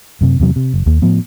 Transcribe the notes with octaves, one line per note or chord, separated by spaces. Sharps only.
F#2 C3
E2 C3 F#3
C3
F#1
D#2 A#3
A2 F3 B3